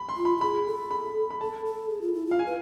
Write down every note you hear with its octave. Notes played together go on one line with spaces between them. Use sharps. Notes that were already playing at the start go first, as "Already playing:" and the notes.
Already playing: B5
C6
F4
B5
F4
G#4 B5
A4
B5
B5
A4 A5
A4
G#4
F4
E4
F4 F5
G#5
B4